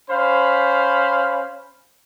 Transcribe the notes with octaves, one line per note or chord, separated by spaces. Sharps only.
C#4 C5 F5 B5